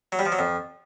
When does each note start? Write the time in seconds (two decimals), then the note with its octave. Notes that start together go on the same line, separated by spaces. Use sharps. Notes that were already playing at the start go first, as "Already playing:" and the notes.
0.12 F#3
0.19 G3
0.26 F3
0.32 F#3
0.39 F2